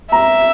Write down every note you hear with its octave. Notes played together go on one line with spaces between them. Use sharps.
E5 A#5